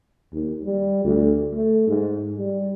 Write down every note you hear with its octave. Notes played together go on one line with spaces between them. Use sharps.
D#2
G3
D2
A3
G#2
G3